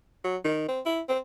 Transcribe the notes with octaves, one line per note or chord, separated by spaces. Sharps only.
F#3
D#3
C4
E4
C4